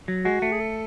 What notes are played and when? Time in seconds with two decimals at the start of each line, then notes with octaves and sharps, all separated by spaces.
0.08 F#3
0.25 G#3 F#4
0.42 A3
0.52 G#4
0.60 A4